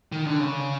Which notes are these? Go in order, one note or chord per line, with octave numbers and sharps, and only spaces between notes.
D#3
D3
C#3